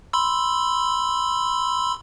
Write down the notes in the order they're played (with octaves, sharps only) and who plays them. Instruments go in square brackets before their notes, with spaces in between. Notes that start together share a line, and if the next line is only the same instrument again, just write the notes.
[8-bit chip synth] B5 C6 E6